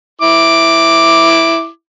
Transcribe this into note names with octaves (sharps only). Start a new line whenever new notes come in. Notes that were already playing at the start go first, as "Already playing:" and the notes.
E4 D6